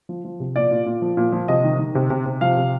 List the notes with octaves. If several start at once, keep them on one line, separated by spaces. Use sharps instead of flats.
F3
F3
C3
A#2 D5
A#2
A#2
F3
A#2
F3
C3 D#5
D#3
D#3
C3
C3
C3
F3 F5
C3